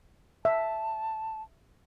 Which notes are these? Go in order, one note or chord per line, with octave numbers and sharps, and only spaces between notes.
E5 A5